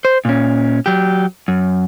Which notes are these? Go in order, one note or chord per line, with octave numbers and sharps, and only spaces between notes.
C5
A#2 C#4
F#3 G4
F#2